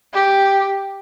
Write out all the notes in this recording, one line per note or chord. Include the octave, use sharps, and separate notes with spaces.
G4